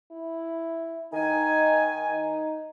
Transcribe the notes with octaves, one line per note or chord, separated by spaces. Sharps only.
E4
D#3 D#4 G#5
D#4